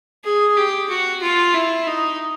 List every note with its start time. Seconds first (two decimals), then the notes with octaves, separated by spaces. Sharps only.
0.24 G#4
0.57 G4
0.90 F#4
1.22 F4
1.54 E4
1.87 D#4